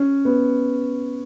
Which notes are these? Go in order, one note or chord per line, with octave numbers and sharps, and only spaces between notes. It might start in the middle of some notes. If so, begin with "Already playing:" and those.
Already playing: C#4
B3